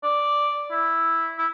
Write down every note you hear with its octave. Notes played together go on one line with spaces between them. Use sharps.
D5
E4
E4